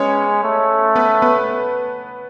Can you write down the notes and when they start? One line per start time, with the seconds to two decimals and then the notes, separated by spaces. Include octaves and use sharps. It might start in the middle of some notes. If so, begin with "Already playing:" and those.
Already playing: G#3 B3 C#4 C#5
0.44 A3
0.96 B3 B4
1.22 B3 B4